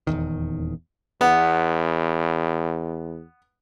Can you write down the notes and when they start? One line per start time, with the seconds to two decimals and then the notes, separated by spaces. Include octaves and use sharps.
0.07 D#1 B1 E2 D#3
1.21 E2 B3